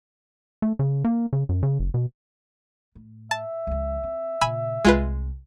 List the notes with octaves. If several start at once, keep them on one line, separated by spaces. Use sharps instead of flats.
A3
C#3
A#3
C#3
F#2
C#3
F#1
B2
A2
E5 A5
C#2 F3
C4
A#2 C#3 G#5 B5 E6
C2 G#3 F4 B4